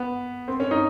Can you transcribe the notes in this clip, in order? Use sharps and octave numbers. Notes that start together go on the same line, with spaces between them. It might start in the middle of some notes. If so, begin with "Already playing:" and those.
Already playing: B3
C4
C#4
D#4